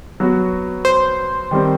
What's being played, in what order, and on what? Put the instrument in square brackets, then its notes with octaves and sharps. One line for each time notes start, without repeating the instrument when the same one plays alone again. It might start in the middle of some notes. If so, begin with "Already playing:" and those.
[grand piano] F#3 B3 F#4
[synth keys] C5
[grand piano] D#3 G3 C4